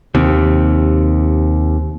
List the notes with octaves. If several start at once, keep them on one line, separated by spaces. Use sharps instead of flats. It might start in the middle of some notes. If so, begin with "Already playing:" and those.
D#2 C3